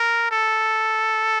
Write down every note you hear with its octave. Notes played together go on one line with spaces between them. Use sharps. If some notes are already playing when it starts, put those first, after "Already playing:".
Already playing: A#4
A4